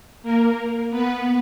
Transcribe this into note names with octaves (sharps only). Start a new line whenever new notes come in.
A#3 A#4
B3 B4